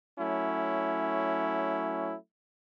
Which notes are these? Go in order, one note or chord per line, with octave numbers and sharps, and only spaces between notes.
F#3 A3 C#4 E4